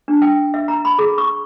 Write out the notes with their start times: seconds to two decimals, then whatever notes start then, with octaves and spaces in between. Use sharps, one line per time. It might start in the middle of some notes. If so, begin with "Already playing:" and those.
0.08 D4
0.22 G5
0.54 E5
0.68 A#5
0.85 B5
0.98 G#4
1.18 C#6